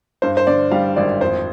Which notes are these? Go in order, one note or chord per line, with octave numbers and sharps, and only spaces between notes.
G2 C5
C5
D3 D5
G3 F5
G#1 D5
F2 C5